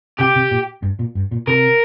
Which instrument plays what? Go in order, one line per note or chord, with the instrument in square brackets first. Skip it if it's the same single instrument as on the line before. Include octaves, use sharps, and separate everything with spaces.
[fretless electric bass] C3 [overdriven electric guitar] G4
[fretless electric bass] C3
A#2
G2
A#2
G2
A#2
[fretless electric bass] C3 [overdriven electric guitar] A#4